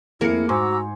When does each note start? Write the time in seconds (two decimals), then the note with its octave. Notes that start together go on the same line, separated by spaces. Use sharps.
0.21 F2 A#3 E4 G#4 A#4 C#7
0.49 G#2 F#4 C5 G#5 A#5 C6 D6 E6